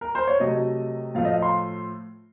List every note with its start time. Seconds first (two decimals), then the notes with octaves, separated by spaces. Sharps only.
0.01 A#4
0.15 C5
0.27 C#5
0.40 C3 F#3 A3 D#5
1.15 A2 F3 A3 F5
1.25 D#5
1.33 F5
1.42 C6